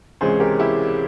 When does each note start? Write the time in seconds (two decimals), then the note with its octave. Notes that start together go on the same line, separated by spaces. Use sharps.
0.21 C#2 C3 E3 G#3 C#4 G#4 C5
0.40 G4 A#4
0.59 E4 G4